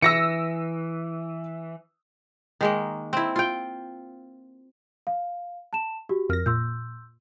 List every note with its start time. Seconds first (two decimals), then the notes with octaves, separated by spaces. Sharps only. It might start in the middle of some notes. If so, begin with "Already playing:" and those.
0.02 E3 E6 A#6 C#7
2.61 D#3 G#3 A#3
3.13 C4 E4
3.36 F4 G5
5.07 F5
5.73 A5 E7
6.09 F#4 G4
6.29 F2 A#4 F6 A#6
6.46 A#2 C6 E6 G6